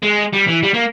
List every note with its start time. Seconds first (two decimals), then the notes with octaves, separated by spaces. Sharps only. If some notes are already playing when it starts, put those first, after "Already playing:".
0.02 G#3
0.33 G3
0.48 E3
0.63 G3
0.74 A#3